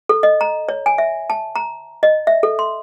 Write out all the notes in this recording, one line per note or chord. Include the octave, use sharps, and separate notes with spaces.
A4
D#5
A#5
C#5
G#5
E5
A5
A#5
D#5
E5
A4
C6